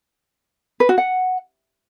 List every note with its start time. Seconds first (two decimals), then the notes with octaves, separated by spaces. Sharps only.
0.80 B4
0.89 F#4
0.98 F#5